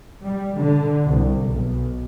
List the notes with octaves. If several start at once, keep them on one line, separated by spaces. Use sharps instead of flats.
G3
D3
C2
B1